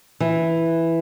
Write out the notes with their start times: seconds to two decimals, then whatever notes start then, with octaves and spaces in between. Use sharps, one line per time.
0.20 E3